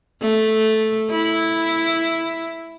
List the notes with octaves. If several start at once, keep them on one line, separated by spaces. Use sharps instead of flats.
A3
E4